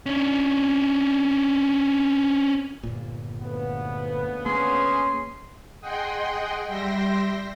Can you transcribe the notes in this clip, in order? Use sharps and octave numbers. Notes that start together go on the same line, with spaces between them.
C#4 D4
G1 A#2
D2 C#3 B3
A#3 C#4 G#4 C6
G#4 D#5 F#5 G5 C6
G3 E5 G5 C6 A#6